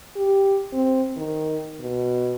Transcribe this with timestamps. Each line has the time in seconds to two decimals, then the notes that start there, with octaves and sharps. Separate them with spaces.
0.16 G4
0.73 C4
1.17 D#3
1.80 B2